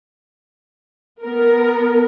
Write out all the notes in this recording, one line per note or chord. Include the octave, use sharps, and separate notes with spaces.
B3 A#4